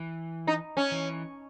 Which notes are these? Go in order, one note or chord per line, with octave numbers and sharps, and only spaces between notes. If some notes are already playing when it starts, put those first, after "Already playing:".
Already playing: E3
D#4
C#4
E3